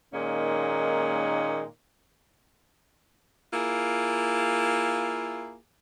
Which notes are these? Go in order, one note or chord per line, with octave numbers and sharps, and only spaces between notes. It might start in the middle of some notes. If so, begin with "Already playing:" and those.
A#2 D#3 G#3 A#3 C#4 D#4
A#3 E4 F4 G#4